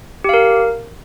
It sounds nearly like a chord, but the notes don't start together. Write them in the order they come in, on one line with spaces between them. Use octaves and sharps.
G4 F5 A#4